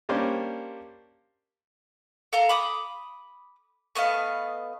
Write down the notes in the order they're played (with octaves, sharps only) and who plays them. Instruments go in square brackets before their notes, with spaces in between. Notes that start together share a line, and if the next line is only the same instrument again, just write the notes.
[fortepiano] G3 A#3 C#4 D4 G4 C5
[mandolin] A4 F5 A#5
B5 D6 D#6
A3 B3 D#5 F5